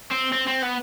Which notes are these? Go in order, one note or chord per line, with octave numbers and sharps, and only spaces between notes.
C4
C4
C4
B3